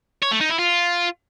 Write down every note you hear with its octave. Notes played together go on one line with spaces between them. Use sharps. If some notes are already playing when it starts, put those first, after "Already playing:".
C#5
A3
D#4
E4
F4